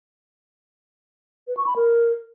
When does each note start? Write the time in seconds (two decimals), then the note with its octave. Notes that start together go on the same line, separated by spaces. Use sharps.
1.48 B4
1.57 C#6
1.67 B5
1.76 A#4